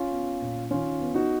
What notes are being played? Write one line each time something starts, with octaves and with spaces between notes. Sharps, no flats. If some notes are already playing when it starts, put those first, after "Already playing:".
Already playing: C#4 F4
B3
A#2
D#3 C#4 F4
B3
D#4 F#4